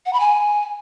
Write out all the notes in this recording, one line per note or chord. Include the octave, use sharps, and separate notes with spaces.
F#5
B5
G#5